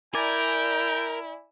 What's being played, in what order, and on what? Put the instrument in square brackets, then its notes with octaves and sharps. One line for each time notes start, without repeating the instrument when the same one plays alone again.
[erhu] E4 [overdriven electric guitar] A#4 [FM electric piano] D5 G#5 [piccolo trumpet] G5